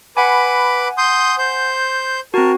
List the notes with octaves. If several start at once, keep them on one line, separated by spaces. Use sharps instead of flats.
B4 F#5 G#5 B5 D6
C6 D#6 G6
C5 G6
C4 F#4 A#4 A5